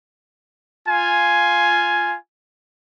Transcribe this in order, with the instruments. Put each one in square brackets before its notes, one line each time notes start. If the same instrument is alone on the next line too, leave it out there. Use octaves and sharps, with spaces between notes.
[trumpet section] F4 G#5